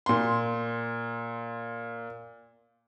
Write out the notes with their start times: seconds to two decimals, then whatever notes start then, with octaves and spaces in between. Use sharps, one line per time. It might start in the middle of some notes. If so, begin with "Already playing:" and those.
0.06 A#2 C6